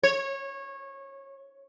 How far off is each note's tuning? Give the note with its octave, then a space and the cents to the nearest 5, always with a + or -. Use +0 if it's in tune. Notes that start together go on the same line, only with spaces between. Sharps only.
C#5 -20